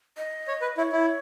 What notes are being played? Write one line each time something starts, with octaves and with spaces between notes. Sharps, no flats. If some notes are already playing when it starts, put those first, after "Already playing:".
D#5
C#5
B4
E4 C#5
E4